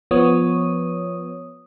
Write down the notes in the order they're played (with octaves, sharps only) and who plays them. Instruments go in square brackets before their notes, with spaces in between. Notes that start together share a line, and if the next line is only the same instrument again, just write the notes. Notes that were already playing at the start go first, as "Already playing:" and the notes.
[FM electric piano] F3 B3 C#5 D#6